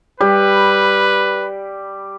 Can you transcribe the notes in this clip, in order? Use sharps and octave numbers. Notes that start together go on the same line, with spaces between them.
G3 B4